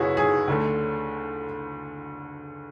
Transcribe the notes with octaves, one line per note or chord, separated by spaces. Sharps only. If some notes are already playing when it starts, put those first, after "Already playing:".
Already playing: F#1 F#2 B3 E4 F#4 G#4 C#5
G#4
D2 D3 A3